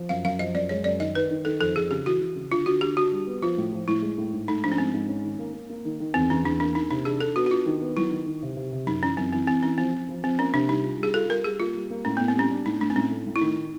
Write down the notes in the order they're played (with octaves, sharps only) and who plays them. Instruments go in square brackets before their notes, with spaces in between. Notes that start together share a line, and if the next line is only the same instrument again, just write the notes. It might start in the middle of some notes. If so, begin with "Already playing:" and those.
Already playing: [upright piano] F3
[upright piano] F#2 [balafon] F5
[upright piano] F#2 [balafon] F5
[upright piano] F3 [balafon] D#5
[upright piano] F#2 [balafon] D5
[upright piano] G#3 [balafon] C#5
[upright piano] F#2 [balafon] D5
[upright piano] D#3 [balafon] D#5
[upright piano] D#3 [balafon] B4
[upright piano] D#3
[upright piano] D#3 [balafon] A4
[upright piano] F2 [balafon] A4
[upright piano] F2 [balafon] G#4
[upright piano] C#3 [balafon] G4
[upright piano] E3 [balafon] F#4
[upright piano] E3
C#3
[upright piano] D3 [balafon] F4
[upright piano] D3 [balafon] F#4
[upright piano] D3 [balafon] G4
[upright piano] D4 [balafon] F#4
[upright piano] G3
B3
[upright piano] F3 [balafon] F4
[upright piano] A2
F3
[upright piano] A2 [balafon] E4
[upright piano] G#3
A2
G#2
[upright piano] A3 [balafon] D#4
[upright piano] F3 [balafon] D4
[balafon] C#4
[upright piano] G#2 [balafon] C4
[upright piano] G#2
C#4
D#3
A#3
A#3
A#3
D#3
D#3
[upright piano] E2 [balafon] C4
[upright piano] E2 [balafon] C#4
[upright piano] E2 [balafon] D4
[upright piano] A#3 [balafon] D4
[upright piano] A#3 [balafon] D#4
[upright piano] C3 [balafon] D#4
[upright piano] D4 [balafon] G#4
[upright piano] D4 [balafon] A4
[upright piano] B3 [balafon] F#4
[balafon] F#4
[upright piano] D4 [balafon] F4
[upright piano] D#3
B3
[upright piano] F#3 [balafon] E4
[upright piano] D#3
D#3
C3
C3
C3
[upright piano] F#2 [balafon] D#4
[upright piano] E3 [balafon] C#4
[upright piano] F#2 [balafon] C4
[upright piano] E3 [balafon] C4
[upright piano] E3 [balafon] C4
[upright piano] E3 [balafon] C#4
[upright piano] F3 [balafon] C4
[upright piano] F3
F3
[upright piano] F3 [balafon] C4
[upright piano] A#3 [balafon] C#4
[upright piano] C3 [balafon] D4
[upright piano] G3 [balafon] D#4
[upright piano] F4
[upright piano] G3 [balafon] G#4
[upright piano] F4 [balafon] A4
[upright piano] G3 [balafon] A#4
[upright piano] G3 [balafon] G#4
[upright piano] A#3 [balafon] F4
[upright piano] G3
A#3
[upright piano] A2 [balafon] C#4
[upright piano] A2 [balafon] B3
[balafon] C4
[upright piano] G3 [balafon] C#4
[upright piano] D4
[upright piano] A2 [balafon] D#4
[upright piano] A3 [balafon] D4
[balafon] C4
[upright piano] A2 [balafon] C#4
[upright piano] A3
A2
[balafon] E4
[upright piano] D#3 [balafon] D#4